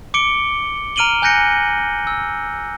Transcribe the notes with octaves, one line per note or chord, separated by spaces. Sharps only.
D6 C#7 D7 G7
A#5 F6 D7 D#7 F#7 G7
G#5 F#6 G6 A#6 C#7
E6